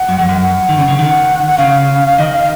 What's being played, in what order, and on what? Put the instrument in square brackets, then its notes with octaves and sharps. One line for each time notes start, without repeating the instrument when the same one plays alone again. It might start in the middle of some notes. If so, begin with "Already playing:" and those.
Already playing: [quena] F#5
[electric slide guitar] F#2
F2
F#2
[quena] F#5
[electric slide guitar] D#3
C#3
C#3
[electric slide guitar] D#3 [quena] F#5
[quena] F#5
[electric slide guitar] C#3 [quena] F5
[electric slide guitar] D#3 [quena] D#5
[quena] F5